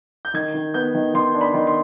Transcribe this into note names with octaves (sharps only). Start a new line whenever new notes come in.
G6
D#3 G#6
D#3
B3 G6
D#3
D#3 C6
D4
B5
D#3
C6